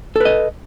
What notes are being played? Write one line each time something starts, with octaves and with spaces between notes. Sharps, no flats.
A4 B4 D#5